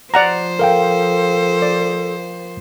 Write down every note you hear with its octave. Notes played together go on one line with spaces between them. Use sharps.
F3 C5 D5 F#5 A#5
A4 A#4 F5 G5
D5